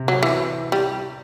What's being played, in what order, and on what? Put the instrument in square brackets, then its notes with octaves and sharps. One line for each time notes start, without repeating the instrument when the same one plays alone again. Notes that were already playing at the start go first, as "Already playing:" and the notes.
Already playing: [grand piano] C3
[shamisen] F#3
E3
G3